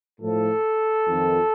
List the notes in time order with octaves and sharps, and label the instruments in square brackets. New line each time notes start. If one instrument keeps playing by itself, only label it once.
[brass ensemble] A2 F3 A4
F2 D#3